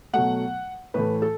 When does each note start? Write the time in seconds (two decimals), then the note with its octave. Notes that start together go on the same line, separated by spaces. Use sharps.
0.13 B2 F#3 A3 F#5
0.94 A2 E3 A3 B4
1.22 A4